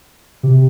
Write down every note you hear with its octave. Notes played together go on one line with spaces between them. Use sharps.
C3